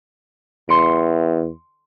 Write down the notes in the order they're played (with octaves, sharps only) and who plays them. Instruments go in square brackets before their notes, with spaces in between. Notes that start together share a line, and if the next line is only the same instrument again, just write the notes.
[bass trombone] E2 [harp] C6 C#7 D7